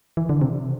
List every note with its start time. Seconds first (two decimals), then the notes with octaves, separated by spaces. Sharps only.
0.17 E3
0.29 D3
0.42 C3